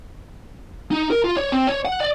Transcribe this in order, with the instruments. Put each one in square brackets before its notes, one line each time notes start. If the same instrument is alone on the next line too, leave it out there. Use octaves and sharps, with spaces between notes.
[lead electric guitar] D#4
A#4
F4
C#5
C4
C#5
F#5
D5